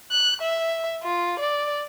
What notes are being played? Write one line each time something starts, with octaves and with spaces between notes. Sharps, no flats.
F#6
E5
F4
D5